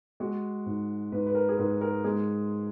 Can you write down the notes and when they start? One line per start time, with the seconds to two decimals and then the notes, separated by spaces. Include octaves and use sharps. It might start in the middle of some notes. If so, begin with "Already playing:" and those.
0.20 G#3 F#4
0.66 G#2
1.12 G#2 B4
1.27 B4
1.35 A#4
1.49 G#4
1.58 G#2 A#4
1.81 A#4
2.04 G#3 G#4